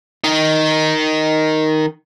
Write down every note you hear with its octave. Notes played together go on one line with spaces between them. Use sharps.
D#3 D#4